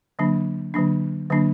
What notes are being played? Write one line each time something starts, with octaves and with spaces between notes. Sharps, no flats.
D3 F#3 A#3 D4
D3 F#3 A#3 D4
D3 F#3 A#3 D4